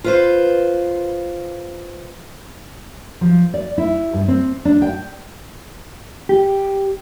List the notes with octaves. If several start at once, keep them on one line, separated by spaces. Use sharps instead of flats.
F4 B4 C5
F3
D5
E4
G2
C4
D4
G5
G4